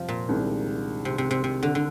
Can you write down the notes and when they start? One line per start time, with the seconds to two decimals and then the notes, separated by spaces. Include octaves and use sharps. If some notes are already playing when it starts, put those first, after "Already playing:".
Already playing: F2 C3 F3 G3
0.08 A#2
0.28 C2 C3 D#3 G#3 D4
1.05 C3
1.18 C3
1.31 C3
1.44 C3
1.63 D3
1.75 D3